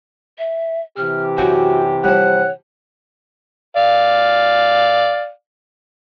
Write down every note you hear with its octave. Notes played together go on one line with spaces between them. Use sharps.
E5
C3 E3 G4 F6
F#2 F#4 F#5 G5
F3 G3 C#5 F#5
D5 F5